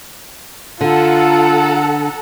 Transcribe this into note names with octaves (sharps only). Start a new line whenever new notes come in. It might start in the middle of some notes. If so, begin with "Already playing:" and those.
D3 F4 A4 F#5 A#5